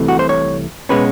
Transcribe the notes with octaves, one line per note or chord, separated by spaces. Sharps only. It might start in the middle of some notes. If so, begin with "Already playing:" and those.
Already playing: C2 C3 E3 A3
F#4
C5
C#5
B2 G#3 C#4 B4